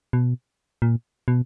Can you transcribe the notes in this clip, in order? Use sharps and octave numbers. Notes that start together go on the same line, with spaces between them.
B2
A#2
B2